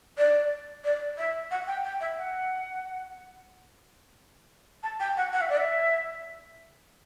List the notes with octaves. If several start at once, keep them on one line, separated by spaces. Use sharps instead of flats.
D5
D5
E5
F#5
G5
G5
E5
F#5
A5
G5
F#5
F#5
E5
D5
E5